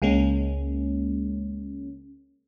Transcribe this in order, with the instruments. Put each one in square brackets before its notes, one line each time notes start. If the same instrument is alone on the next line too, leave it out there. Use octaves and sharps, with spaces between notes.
[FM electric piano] C#2 G#3 A#3 C#4